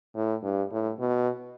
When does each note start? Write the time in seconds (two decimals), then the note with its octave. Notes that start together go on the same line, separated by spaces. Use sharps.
0.15 A2
0.43 G2
0.72 A2
0.99 B2